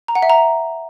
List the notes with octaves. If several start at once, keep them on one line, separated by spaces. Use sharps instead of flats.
A#5
F#5
E5
A#5